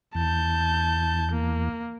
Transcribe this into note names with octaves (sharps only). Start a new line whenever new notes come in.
E2 A5 G6
A#3